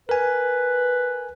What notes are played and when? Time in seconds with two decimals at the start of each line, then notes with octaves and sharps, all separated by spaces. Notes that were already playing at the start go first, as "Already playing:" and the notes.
0.09 A#4 B4 G#5